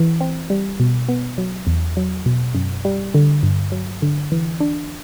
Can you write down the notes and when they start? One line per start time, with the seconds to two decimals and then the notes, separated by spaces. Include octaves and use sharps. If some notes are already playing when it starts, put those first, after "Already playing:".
Already playing: E3
0.21 C4
0.50 G3
0.80 B2
1.08 B3
1.38 F#3
1.67 E2
1.97 F#3
2.26 B2
2.55 F#2
2.85 G3
3.14 D3
3.43 G2
3.72 F#3
4.02 D3
4.32 E3
4.60 D4